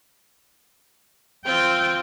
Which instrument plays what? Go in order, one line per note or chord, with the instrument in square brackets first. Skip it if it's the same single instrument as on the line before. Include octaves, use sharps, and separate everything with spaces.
[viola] C4 F4 [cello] G5